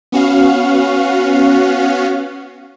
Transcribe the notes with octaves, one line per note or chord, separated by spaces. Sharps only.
B3 C#4 F#4 F5